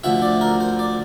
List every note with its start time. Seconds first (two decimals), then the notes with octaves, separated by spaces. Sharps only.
0.04 D2 D3 F3 E5
0.22 D5
0.41 A#4
0.60 C5
0.79 D5